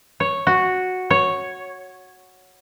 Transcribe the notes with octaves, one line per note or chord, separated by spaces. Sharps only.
C#5
F#4
C#5